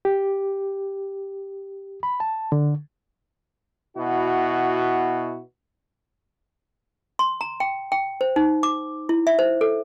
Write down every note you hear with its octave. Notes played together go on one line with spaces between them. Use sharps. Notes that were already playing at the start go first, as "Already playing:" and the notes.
G4
B5
A5
D3
B2 E4 F#4
C6
A#5
G5
G5
C5
D#4
D6
E4
E5
C5
A4